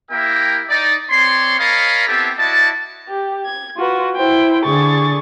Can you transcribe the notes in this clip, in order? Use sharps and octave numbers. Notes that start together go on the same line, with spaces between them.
A#3 E4 G4 A#4 E5 G5
D#4 D5
C4 C#5 D5 C6
A#4 C#5 D#5 F5 A5 B5
B3 C4 E4 G4 A4
E4 F#4 D5 D#5 A5
G4
G#6
F4 F#4 B4
E4 C5 G5
D3 G#4 C#6 A6